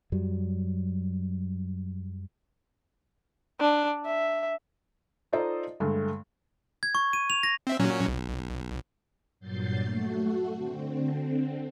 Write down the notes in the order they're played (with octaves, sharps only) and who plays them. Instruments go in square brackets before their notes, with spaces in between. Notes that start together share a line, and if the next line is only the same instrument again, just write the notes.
[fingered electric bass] F#2 F#3 G3
[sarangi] D4
E5
[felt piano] D#4 F4 A4 C5 D5 D#5
G2 D3 G#3 A3
[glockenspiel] G#6
C#6
D#7
F7
A#6
[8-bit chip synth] C4 E5
A#2 F#3 C#4
B1
[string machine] G2 A#2 F#3 G6 A6 C7
A3 F#4
D3 C4